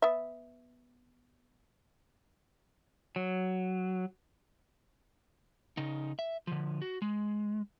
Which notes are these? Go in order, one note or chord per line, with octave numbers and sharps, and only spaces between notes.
B3 E5
F#3
C#3 D#4
E5
D3 F3
F#4
G#3